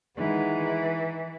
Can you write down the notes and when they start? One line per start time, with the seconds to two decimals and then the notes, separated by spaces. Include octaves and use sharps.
0.18 D#3 E3 G#3 B3 D#4